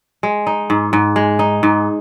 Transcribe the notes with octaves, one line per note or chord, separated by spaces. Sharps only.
G#3
D#4
G#2
G#2
G#3
D#4
G#2